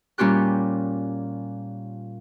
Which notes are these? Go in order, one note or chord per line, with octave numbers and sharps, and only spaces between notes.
A#2 G3 C#4 F4 G4 F#6